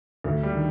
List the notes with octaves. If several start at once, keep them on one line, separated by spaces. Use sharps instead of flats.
D2
G3
D#3